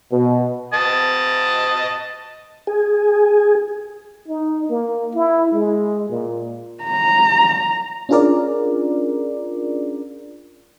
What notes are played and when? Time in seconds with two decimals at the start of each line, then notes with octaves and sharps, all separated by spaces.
0.12 B2
0.74 D#5 A5
2.67 G#4
4.28 D#4
4.69 A#3
5.15 E4
5.52 G#3
6.10 A#2
6.84 A#5
8.09 C#4 D4 F4 G#4 A#4 D5